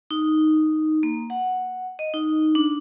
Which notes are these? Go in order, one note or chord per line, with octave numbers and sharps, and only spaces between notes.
D#4
A#3
F#5
D#5
D#4
D4